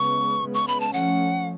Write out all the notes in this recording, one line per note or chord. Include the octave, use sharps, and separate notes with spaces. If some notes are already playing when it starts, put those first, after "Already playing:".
Already playing: C#3 G#3 B3 C#6
C#3 G#3 B3
C#6
B5
A5
F3 A3 C#4 F#5